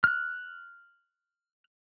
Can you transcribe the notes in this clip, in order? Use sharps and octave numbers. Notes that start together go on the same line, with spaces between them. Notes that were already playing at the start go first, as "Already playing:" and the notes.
F6 F#6